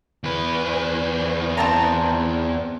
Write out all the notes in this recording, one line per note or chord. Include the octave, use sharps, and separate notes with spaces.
E2 B4
C4 A5 A#5